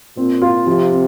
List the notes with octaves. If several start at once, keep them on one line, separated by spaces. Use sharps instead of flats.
A#2 C4
F4
C3 F3
C4